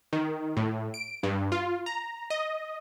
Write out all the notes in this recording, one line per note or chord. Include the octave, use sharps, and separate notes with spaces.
D#3
A2
D7
G2
F4
A#5
D#5